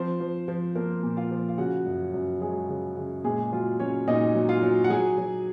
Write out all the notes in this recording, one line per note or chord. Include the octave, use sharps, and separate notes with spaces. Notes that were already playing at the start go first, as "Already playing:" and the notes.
Already playing: F3 C4 C5
F3
F3
F3 A#3 A#4
A#2
F4 F5
F3
F5
C#3 F#4 F#5
F#2
F#2
F#3 G#3 G#4
C#3
C#3
A#2 G#3 G#4
F#3 F4
F#3 C#4 C#5
A#2 D#4 D#5
F#3
F4 F5
F#3
F#5
F#3 G#4 G#5
F#3